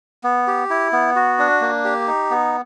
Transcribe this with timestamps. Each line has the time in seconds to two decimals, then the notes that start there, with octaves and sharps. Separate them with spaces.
0.24 B3
0.48 G4
0.70 E4
0.93 B3
1.16 F#4
1.39 D4
1.61 A#3
1.85 G4
2.07 D#4
2.31 B3